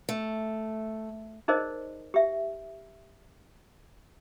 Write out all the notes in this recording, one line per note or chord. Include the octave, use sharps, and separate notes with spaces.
A3
D#4 G#4 A#4 C5 D5 D#5
G4 E5